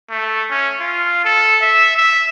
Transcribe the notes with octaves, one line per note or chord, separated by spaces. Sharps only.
A3
C#4
F4
A4
E5
E5